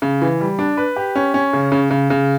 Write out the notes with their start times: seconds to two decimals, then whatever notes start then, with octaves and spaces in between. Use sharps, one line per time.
0.02 C#3
0.22 E3
0.40 G3
0.59 D4
0.77 B4
0.96 G4
1.15 C#4
1.34 C#4
1.53 C#3
1.72 C#3
1.91 C#3
2.10 C#3